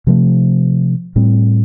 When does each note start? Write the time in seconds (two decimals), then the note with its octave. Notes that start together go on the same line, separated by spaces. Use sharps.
0.07 C3 F3 A3
1.16 A2 G3 C4